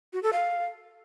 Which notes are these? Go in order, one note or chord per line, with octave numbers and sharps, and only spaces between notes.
F#4
A4
F5